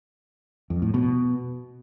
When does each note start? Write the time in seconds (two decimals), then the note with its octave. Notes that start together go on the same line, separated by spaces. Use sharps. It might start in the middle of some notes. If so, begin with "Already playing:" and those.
0.70 F2
0.82 A2
0.94 B2